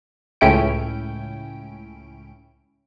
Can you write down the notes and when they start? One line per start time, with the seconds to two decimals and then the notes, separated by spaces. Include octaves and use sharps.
0.41 C#2 A2 C#4 E4 G5 D7